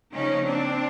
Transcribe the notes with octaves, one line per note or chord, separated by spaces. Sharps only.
C#3 F3 A#3 C#4 D#4
C4 D4